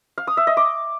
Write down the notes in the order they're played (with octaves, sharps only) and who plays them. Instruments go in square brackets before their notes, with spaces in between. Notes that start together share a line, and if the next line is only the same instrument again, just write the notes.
[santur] F5
D#6
E5
D#5
D6